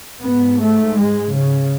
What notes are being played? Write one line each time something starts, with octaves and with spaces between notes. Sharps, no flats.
G#2 B3
A3
G#3
C#3